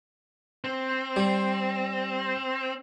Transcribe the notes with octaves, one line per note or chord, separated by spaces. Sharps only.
C4
G3